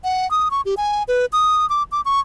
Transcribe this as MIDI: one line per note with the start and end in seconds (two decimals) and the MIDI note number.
0.04 0.29 78
0.31 0.49 87
0.51 0.61 85
0.65 0.75 67
0.77 1.03 80
1.08 1.26 71
1.33 1.68 87
1.69 1.83 86
1.92 2.01 86
2.05 2.20 85